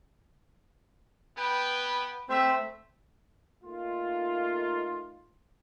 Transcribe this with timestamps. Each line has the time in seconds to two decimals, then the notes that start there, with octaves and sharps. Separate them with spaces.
1.38 B3 B4 G5
2.29 A3 C4 C5 E5
3.64 A3 A#3 D#4 F4